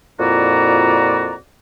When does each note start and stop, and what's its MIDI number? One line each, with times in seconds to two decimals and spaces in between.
0.20 1.34 41
0.20 1.34 46
0.20 1.34 64
0.20 1.34 66
0.20 1.34 74
0.20 1.34 82